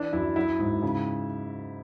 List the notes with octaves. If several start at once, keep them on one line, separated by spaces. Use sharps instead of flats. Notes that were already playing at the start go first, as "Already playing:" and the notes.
Already playing: E3 D4
F#2 E4
F#3 E4
G#2
C#3